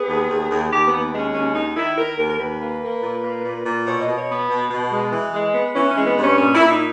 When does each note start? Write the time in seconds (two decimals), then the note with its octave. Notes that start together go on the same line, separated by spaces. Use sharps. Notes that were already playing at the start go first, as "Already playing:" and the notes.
Already playing: B3 G#4
0.09 D#2
0.29 D#2
0.51 D#2
0.71 D#2 G4
0.87 B3
0.93 D#2
1.13 G#3
1.19 C#4
1.34 D#2 C#4
1.55 D#3 D#4
1.76 D#3 E4
1.98 D#3 A#4
2.19 D#2 A#4
2.30 A#4
2.40 D#2 B4
2.60 A#3
2.82 A#3
3.03 A#2
3.23 A#3
3.45 A#2
3.66 A#2
3.86 B2 C#5
4.02 D#5
4.08 B2
4.18 C#5
4.28 B3
4.50 B2
4.70 B2
4.91 G#3
5.12 E3
5.34 G#3
5.54 B3
5.75 E3 C#4
5.91 C#4
5.97 G#3
6.07 B3
6.17 G2
6.23 C#4
6.38 A#2 C#4
6.55 E4
6.59 A#2
6.66 E4
6.70 D#4